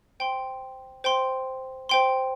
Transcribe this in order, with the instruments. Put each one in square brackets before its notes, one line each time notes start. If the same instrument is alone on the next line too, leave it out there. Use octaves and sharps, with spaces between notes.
[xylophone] C5 G5 C6
C5 G5 C6
C5 G5 C6